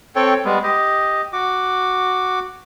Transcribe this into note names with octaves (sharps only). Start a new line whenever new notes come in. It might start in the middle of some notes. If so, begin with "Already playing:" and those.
C4 A4 C#5 G5
G3 G#3 B3
G4 D#5
F#4 D6